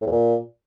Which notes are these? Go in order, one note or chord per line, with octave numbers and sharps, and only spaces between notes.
A2
E2
A#2